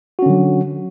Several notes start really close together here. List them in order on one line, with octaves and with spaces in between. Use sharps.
F#4 C#4 D3 F#3